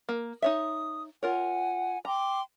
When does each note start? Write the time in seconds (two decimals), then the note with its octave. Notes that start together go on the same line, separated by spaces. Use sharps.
0.09 A#3
0.42 D#4 C#5 E5 D#6
1.23 F4 A#4 C#5 F#5 G#5
2.05 G5 A#5 C6 D6